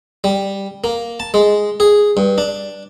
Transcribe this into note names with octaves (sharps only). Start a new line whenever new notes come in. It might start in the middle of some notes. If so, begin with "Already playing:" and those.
G3
A#3
A5
G#3
G#4
G2
D4